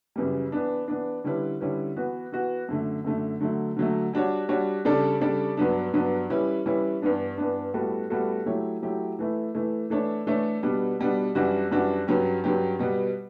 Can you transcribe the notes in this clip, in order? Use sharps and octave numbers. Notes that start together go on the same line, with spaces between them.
F#2 C#3 E3 G3
E3 B3 D4
E3 B3 D4
D3 G3 C#4 E4 B4
D3 G3 C#4 E4 B4
E3 B3 F#4
E3 B3 F#4
F#2 D3 A3
F#2 D3 A3
D3 F#3 A3
D3 F#3 A3
G3 D4 F#4 C#5
G3 D4 F#4 C#5
C#3 G3 D4 A4 D5
C#3 G3 D4 A4 D5
G2 F#3 B3 D4
G2 F#3 B3 D4
E3 G3 C#4 E4 B4
E3 G3 C#4 E4 B4
G2 E3 B3 D4
G2 E3 B3 D4
A2 G3 B3 F#4 A4
A2 G3 B3 F#4 A4
F#3 A3 E4 G4 C#5
F#3 A3 E4 G4 C#5
E3 A3 E4
E3 A3 E4
E3 A3 D4 A4 C#5
E3 A3 D4 A4 C#5
B2 G3 B3 D4
B2 G3 B3 D4
F#2 E3 G3 D4 F#4
F#2 E3 G3 D4 F#4
G2 F#3 C#4 G4
G2 F#3 C#4 G4
B2 G3 B3